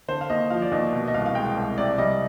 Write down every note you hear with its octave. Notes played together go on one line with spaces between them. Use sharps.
D3 C5
F5
D#2 D#5
F3 F5
D5
D#2 D#5
B2
D#5
C2 F5
F5
G#3 G5
C2
C3 D5
G3 D#5